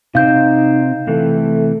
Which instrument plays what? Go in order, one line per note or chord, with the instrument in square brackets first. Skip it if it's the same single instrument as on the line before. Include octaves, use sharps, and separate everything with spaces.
[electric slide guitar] C3 C4 [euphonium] D#4 [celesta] F5 G6
[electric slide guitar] C3 E3 [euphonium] A3